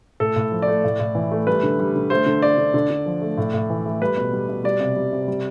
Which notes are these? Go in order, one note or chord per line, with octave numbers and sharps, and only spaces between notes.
A2 A4
A2
F3
D5
A3
A2
A2
E3
A3
G3 B4
D3
G3
D3
A3 C5
D3
A3 D5
D3
D3
D3
F3
A3
A2
A2
E3
A3
G3 B4
B2
G3
B2
G3 D5
C3
G3
C3
G3